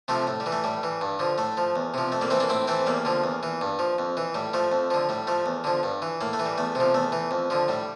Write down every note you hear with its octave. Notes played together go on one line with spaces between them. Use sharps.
C3 F3 A3
A2
G3
E3
A3
A2 G3
E3
G2
D3 F3
A2 A3
F3
E2
C3 F3
F2 A3
G3 A#3
E3 A3 C4
A#3 D4
A2 C4 E4
E3 A3 C4
E2 G3 A#3
D3 F3
E2
E3
G2
F3
F2
E3
A2 G3
F3 A3
F2
D3 F3
A2 G3
F3 A3
E2
D3 F3
G2
E3
A2 A#3
A3
E3
G3
E2 A3
C3 F3
E2 A3
E3
F2
D3 F3
A2 G3